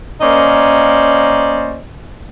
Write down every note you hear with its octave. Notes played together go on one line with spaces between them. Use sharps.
A#3 C#4 A#4 C5 D5 D#5